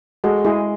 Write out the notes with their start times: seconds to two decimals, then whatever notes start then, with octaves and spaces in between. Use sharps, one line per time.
0.24 G#3 F#4 A4
0.45 G#3 E4 G#4